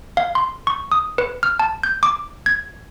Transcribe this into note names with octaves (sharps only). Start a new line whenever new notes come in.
F5
C6
C#6
D#6
B4
F6
A5
G6
D6
G#6